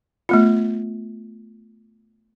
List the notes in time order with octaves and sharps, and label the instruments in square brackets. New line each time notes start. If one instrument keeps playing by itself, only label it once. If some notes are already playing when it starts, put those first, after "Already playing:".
[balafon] A3 B3 F4